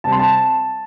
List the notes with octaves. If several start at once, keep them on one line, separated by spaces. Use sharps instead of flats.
C3 G3 C4 A5
C6
A5